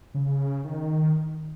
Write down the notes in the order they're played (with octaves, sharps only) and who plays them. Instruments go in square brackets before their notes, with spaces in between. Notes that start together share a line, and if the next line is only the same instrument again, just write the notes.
[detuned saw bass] C#3
D#3